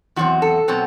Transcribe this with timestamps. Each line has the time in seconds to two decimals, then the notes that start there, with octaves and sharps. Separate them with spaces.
0.16 E2 C3 F#3 C4 F#4
0.42 A4
0.68 B2 F#3 C4